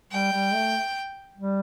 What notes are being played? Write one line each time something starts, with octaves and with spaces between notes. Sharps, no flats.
G3 G5
G3
A3
G3